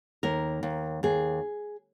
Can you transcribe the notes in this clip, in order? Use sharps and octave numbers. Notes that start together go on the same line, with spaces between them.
D#2 A#4
D#2
D#2 G#4